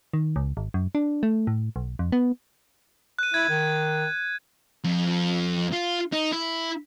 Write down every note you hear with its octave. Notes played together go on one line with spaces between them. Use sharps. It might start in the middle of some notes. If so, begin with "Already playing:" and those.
D#3
C#2
G#1
F#2
D4
A3
A2
B1
F2
B3
F#6 D#7
E4 G#6
D#3
F2
F4
D#4
E4